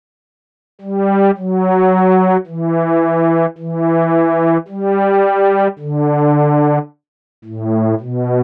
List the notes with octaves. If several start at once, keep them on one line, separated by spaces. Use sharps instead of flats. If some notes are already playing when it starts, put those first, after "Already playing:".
G3
F#3
E3
E3
G3
D3
A2
B2